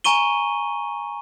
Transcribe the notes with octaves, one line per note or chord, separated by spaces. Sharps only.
G#5 A#5 C#6 D#7 G7